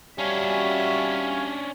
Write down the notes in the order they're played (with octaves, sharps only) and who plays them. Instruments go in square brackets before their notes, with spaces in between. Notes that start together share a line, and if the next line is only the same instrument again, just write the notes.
[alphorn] G3 [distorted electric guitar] C#4 D4 [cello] F#4 E5 [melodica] C#5 F5 G#5